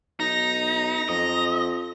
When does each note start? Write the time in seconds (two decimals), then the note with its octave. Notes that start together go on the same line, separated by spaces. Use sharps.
0.20 B1 D#4 A#5 A#6
1.09 F2 D#5